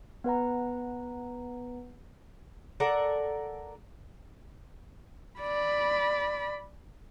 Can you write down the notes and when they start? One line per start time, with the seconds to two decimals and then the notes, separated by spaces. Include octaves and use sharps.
0.24 B3 B4 F#5 A#5
2.80 A4 A#4 D5 F#5
5.40 D5 B5